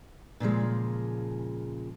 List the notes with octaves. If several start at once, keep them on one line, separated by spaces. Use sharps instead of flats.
A#2 C#3 F3 G#3